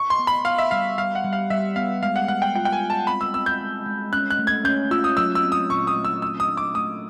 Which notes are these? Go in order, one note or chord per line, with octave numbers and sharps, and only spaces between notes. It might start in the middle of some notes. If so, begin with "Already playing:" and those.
Already playing: C#6
C6
B3
B5
B3 F5
E5
G3 F5
G3 F5
F#5
G3
F5
G3 E5
B3 F5
G#3 F5
F#5
G#3 F#5
G5
F4 G5
G5
G#5
F4
A5
C4 B5
E6
C4 E6
G6
G#3
G#3
C#4 F#6
F#6
A3
G#6
C#4 G6
F4 E6
D#6
F#3 E6
E6
C4
D#6
A#2 C#6
D#6
A3
E6
A3 E6
D#6
D4
D6
A3 D#6